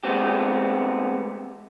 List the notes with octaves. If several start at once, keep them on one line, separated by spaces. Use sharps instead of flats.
G#3 A3 B3 C4 G4